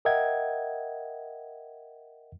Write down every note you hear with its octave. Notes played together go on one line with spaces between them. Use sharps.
A#4 D#5 E5 F#5 G5 G#6